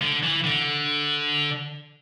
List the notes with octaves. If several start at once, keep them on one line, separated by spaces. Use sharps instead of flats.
D3
E3
D3